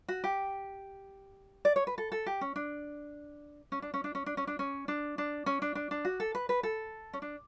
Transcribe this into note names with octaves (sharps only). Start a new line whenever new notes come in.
F#4
G4
D5
C#5
B4
A4
A4
G4
C#4
D4
C#4
D4
C#4
D4
C#4
D4
C#4
D4
C#4
D4
D4
C#4
D4
D4
D4
F#4
A4
B4
B4
A4
C#4
D4